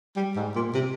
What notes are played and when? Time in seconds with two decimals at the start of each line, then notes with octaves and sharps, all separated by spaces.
0.16 G3
0.36 G#2
0.55 A#2
0.74 C3